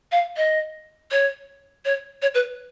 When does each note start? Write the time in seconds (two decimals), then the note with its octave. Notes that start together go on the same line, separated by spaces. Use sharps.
0.12 F5
0.37 D#5
1.11 C#5
1.85 C#5
2.22 C#5
2.35 B4